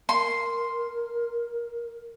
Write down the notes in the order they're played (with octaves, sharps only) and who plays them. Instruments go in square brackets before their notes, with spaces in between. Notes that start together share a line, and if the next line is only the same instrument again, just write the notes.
[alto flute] A#4 [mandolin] C6